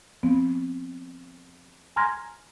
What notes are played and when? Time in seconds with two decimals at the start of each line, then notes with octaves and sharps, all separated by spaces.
0.23 F3 B3 C4
1.96 G#5 A#5 C6 F6 G#6 A#6